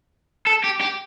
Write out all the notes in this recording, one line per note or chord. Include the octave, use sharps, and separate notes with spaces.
A4
G4
G4